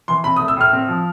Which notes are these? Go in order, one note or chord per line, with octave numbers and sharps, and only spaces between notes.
E3 C6
C4 B5
D#6
A3
E6
A2 F6
C4
F3